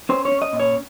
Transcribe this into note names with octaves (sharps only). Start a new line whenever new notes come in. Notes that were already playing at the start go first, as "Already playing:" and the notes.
C#4 C5
C#5
C#4
D#5
A#2
C#5